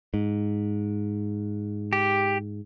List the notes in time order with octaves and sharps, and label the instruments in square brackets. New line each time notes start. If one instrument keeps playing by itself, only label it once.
[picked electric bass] G#2
[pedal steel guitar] G4